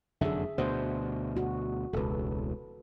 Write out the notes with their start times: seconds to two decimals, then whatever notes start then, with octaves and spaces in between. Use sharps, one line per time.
0.21 F1 F#2 D3 G#4 E5
0.58 D2 B2 C5
1.37 F#4
1.93 E1 C#2 A4 B4